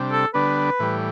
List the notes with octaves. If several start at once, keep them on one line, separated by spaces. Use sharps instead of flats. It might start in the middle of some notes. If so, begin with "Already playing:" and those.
Already playing: C3 G3 D4
A4
D3 G3 B3 D4 B4
A2 E3 G3